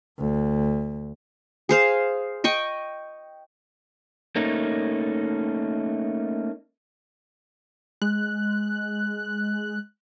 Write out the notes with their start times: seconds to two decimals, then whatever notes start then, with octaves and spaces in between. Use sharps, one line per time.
0.19 D2
1.69 G#4 C5 F5
2.44 D#5 G5 C#6
4.36 A3 A#3 C#4 D#4
8.02 G#3 F#6